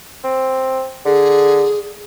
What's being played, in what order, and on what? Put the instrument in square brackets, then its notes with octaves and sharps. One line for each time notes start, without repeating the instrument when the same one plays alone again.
[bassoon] C4
[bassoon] D3 [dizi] G#4